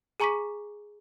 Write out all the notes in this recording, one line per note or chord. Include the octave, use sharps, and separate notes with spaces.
G#4 G#5 A#5 C#6 D6 B6